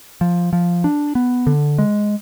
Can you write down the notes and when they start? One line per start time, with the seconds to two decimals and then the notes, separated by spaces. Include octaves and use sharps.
0.21 F3
0.53 F3
0.84 D4
1.15 B3
1.47 D3
1.78 G#3